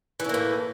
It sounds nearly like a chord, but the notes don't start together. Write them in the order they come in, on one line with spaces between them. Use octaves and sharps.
E3 C#4 A#3 A2